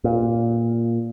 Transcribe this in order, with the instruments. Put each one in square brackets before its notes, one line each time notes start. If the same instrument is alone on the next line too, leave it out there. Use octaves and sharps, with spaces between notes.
[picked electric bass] A#2